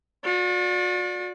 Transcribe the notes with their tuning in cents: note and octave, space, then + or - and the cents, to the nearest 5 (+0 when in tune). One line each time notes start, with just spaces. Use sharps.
F#4 -45 D5 +0